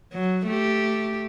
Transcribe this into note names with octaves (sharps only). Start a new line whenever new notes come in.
F#3
A3 G4